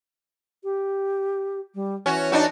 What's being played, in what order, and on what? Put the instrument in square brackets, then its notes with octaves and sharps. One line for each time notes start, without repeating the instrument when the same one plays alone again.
[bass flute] G4
G3
[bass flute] E3 [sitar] C#4 F#4
[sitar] D4 D#4 F#4